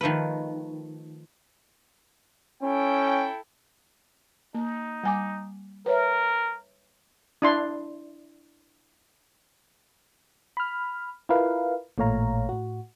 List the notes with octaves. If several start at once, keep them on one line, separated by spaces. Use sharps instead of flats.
D#3 F3 A3 B4
C#4 E4 A4 G5
A#3 D#4
G3 G#5 D6
A#4 B4 C#5 E5
D4 E4 C6
B5 F6
E4 F4 A#4 B4 F5
A1 A#2 A3 C#5 F5 A#5
A2 F#4